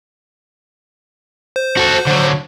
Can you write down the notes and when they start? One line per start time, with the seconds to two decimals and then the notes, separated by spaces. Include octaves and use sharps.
1.56 C5
1.77 F#4 A4
2.07 D3 F#3